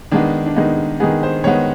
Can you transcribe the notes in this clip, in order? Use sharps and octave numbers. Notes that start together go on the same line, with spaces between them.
D#3 G#3 B3 D4
D4
D#3 G#3 B3 D#4
D#3 G#3 B3 G#4
C5
D#3 G#3 B3 C#5